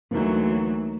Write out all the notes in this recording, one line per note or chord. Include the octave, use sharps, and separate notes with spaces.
D2 E3 F#3 A#3 D#4